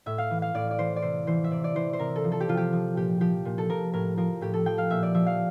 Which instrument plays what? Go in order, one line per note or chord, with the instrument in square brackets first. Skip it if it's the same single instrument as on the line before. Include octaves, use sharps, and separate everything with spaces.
[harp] A2 E5
F5
E3
F5
A2 D5
D5
E3 C5
D5
C3 C5
E3 C5
E5
C3 D5
D5
E3 C5
C5
C3 A#4
A4
F3
A4
G4
C3 F4
G4
F3
A#2 G4
F3 G4
A#2
A4
F3 A#4
A2 A#4
F3 A#4
A2 G4
A4
F3 G5
F5
A#2 E5
D5
F3 E5
F5